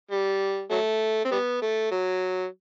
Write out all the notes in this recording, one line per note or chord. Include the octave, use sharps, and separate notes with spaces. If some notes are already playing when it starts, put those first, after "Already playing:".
G3
F#3 A3
C4
G3 B3
A3
F#3